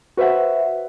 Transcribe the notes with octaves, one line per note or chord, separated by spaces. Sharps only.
F#4 B4 C5 E5 F#5